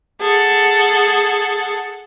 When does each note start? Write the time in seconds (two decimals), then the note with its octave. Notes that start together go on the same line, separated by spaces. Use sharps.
0.19 G#4 A4 F#5